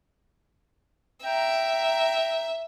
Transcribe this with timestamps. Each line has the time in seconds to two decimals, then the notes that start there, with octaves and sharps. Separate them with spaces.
1.24 E5 G5 A#5